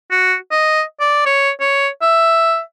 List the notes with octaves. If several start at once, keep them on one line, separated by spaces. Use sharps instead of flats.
F#4
D#5
D5
C#5
C#5
E5